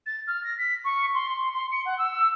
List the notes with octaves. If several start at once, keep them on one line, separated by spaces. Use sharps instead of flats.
A6
F6
A#6
B6
C#6
C6
C6
C#7
F#5
E6